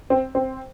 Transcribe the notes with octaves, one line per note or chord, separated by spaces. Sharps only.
C4
C4